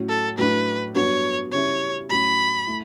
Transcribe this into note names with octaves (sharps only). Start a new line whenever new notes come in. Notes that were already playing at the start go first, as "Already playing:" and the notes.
Already playing: A2 F#3 C#4 F#4
A4
A2 F#3 A3 D4 B4
G2 F#3 B3 D4 F#4 C#5
C#3 G3 C#4 E4 C#5
A2 F#3 C#4 B5
A3 E4